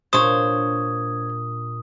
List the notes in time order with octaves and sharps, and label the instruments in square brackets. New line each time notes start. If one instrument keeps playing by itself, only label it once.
[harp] A#2 D4 [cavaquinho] C5 C#5 [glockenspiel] D#6